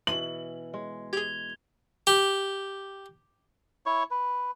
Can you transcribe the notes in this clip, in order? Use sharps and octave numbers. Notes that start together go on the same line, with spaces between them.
B2 E3 C6 D#7 F#7
G#3
G4 G#4 G#6 F7 G7
G4
E4 C#5 C#6
B4